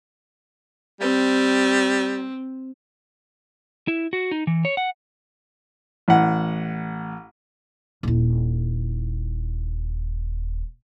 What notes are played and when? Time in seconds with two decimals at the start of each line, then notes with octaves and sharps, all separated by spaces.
1.01 G3 C4
3.88 E4
4.13 F#4
4.31 D#4
4.47 E3
4.65 C#5
4.77 F#5
6.08 A1 F#5
8.03 D#1 E4